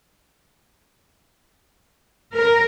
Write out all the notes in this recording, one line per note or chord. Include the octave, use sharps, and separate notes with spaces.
A#4